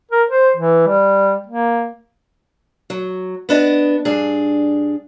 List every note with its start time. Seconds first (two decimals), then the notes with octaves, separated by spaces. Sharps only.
0.11 A#4
0.30 C5
0.56 E3
0.87 G3
1.46 A#3
2.90 F#3
3.49 B3 D4 D#5
4.05 G2 D4 G#4